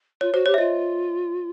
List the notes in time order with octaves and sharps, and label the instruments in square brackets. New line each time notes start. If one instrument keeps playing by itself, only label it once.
[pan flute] F4 [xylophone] C#5
[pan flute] F#4 [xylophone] C5
[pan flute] G4 [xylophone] C#5
[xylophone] E5
[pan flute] F4 [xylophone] D#5